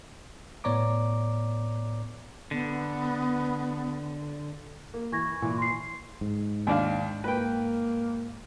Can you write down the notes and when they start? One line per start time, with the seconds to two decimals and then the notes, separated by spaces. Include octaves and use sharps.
0.64 A2 B3 C#5 D5 A#5 D6
2.51 D3 B3
4.94 A#3
5.12 E3 C#6 G#6 A#6
5.42 A#2 E3
5.58 C6 C7
6.21 G#2
6.67 D#2 D4 F5
7.24 A#3 B4 G5